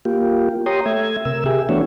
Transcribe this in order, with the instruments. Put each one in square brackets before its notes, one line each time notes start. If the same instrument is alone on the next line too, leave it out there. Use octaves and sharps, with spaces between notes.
[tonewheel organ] A#3 F4 G4
G4 C#5 G5 A#5 C6 D#6
A3 E5 G#6
C3 A#4 E6
G4 G#4 E5
E3 A3 B3 D4 F#4 C#5